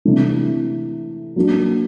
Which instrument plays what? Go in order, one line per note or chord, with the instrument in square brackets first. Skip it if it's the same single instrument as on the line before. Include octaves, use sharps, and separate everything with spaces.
[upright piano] C3 E3 A3 D4
F#3 A#3 D4